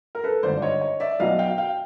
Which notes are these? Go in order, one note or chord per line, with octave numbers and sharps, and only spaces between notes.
A#4
A4 B4
G#1 G2 D3 C5 D5
D5
C#5 D#5
C#5 D#5
D5 E5
B1 B2 F#3 D#5 F5
F5 G5
F5 G5